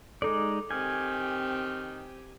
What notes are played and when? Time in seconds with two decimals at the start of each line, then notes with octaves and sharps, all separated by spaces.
0.22 G#3 D#4 A4 D5 D6
0.71 D#3 C4 G4 G#5